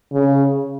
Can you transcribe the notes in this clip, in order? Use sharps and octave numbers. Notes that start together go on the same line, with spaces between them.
C#3